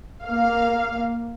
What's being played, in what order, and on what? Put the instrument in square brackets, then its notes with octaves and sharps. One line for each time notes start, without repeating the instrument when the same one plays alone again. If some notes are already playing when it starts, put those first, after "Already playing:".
[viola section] A#3 F5